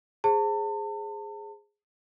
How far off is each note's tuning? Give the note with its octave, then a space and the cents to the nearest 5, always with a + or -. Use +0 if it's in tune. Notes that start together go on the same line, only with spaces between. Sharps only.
G#4 -5 C5 +0 A5 +35